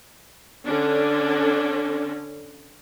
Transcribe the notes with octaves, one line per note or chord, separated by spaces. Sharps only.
D3 C#4 D4